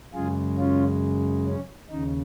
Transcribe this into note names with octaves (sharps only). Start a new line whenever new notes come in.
F#2 C#3 G#3 F4 G#4
C#4 F4
C#4
D#2 C#3 D#4